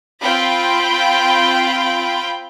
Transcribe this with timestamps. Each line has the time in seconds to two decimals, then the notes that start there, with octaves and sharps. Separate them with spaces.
0.21 C4 F4 G5 B5